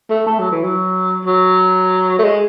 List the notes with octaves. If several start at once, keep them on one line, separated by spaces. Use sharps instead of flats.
A3
A3
F#3
E3
F#3
F#3
A3
G#3